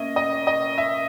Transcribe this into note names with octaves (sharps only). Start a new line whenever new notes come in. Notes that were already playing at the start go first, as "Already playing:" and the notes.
Already playing: A#3 C#4 D#5 E5
D#5
D#5
E5